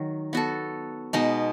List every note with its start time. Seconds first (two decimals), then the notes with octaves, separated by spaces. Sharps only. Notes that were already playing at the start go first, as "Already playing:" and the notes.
Already playing: D#3 F#3
0.33 B3 F#4 A4
1.13 B2 G#3 D#4